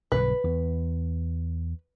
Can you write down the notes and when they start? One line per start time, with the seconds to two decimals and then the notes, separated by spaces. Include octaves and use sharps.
0.12 B1 G2 D3 B4
0.44 E2